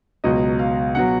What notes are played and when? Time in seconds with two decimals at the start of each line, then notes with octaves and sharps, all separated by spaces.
0.24 C#2 B2 F#3 D#5
0.59 F5
0.95 B2 F#3 F#5